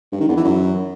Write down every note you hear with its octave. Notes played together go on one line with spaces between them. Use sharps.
G2
D#3
E2
E3
F#2